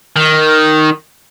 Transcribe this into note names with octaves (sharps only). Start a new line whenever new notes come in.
D#3